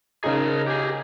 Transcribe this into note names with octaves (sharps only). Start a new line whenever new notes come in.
C#3 D#4 G#4 A#4
G4 G#4